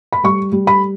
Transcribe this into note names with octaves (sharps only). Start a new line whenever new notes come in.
B5
G3 C#6
G3
B5